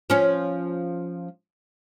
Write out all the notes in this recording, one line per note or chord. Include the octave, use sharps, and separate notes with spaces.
F3 C#4